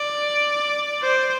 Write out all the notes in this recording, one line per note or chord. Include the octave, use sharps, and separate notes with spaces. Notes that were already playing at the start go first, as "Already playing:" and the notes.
Already playing: D5
C5